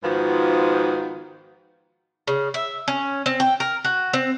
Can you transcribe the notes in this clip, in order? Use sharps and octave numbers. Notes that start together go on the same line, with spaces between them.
G#2 D#3 F3 B3 F4 F#4
C#3
E5
C#4
C4
G5
A#4
F#4
C4